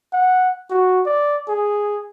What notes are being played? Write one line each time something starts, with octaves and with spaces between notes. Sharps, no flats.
F#5
F#4
D5
G#4